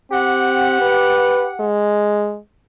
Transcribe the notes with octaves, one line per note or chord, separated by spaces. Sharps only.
C4 G4 F#5
B4
G#3